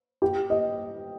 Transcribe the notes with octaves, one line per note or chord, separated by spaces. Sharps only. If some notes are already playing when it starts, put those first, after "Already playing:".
G4
D#5